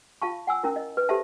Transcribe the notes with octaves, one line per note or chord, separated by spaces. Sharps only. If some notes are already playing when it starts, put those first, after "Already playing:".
F4 F5 A5 C#6
F#5 G#5 E6
C#4 E4 A#4
D#5
B4
G4 A4 C5 E5 A5